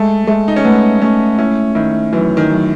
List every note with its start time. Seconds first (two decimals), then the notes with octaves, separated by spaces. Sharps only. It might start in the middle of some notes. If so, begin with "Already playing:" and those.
Already playing: G#3 A3
0.27 G#3 A3
0.48 D#4
0.56 C#4
0.64 A3 B3
1.01 A3 C#4
1.39 C#4 E4
1.75 D#3 E4
2.12 F#2 E3
2.37 D#3
2.50 F#2